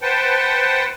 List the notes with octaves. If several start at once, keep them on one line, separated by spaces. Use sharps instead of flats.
B4 C5 F#5 G5 A5